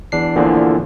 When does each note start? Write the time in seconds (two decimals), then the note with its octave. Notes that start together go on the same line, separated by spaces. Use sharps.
0.12 E2 D4 C7
0.36 E2 A#2 D3 E3 F3